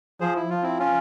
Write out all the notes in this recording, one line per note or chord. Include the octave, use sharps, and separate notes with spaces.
F3 G#4 C5
E4
F3 F4
C4 E4
C#4 F4